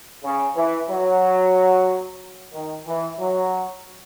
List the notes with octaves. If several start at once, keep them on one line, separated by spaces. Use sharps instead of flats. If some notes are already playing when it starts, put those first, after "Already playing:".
C#3
E3
F#3
D#3
E3
F#3